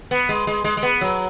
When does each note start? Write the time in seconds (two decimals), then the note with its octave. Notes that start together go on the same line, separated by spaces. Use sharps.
0.11 B3
0.29 G#3
0.47 G#3
0.64 G#3
0.77 G#3
0.83 B3
1.01 F#3